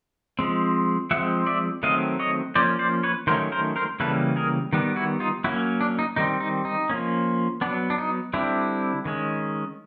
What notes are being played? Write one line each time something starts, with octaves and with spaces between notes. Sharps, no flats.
F3 G#3 C4
F3 G#3 C4 E5 F#5
D5 E5
D#3 F#3 A3 C4 D#5 F5
C#5 D#5
F3 A#3 C#4 C5 D5
C5 D5
B4 C#5
D#3 F#3 A3 C#4 A#4 C5
A#4 C5
A#4 C5
C#3 E3 G3 A#3 C#4 A4 B4
G#4 A#4
D#3 G3 B3
E4 F#4
D#4 F4
F#3 A#3 C#4 D4 E4
D4
D#4
D#3 G3 C4 D#4
D#4
D#4
F3 A#3 C#4
F#3 B3 D4
D4
D#4
D3 G3 C4 D4 E4
D#3 G#3 C#4